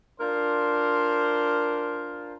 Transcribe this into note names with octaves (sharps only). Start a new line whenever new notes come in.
D4 F4 A#4 C5